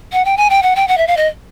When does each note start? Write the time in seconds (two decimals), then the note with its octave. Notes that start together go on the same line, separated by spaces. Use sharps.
0.13 F#5
0.25 G5
0.37 G#5
0.50 G5
0.63 F#5
0.76 G5
0.88 F#5
0.98 E5
1.07 F5
1.17 D#5